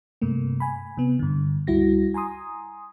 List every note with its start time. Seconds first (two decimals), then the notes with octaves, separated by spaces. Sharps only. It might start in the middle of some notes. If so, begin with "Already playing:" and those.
0.22 G2 C3 A3 A#3
0.60 G#5 B5
0.97 C3 B3
1.19 G2 D3
1.67 C#2 G3 E4 F#4 A#6
2.14 G#5 A#5 C6 D#6